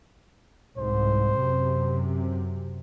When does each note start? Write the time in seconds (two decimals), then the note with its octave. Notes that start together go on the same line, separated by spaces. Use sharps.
0.78 C2 G#2 C5
1.38 F#2 C3